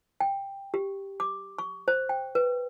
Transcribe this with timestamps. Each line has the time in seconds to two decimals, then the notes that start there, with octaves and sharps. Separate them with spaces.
0.20 G5
0.74 G4
1.20 D6
1.59 C#6
1.88 C5
2.09 G5
2.35 B4